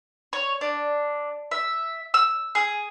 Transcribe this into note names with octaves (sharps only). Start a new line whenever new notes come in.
C#5
D4
E5
E6
G#4